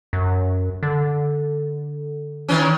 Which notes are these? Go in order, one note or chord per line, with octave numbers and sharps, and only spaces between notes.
F#2
D3
D#3 E3 C#4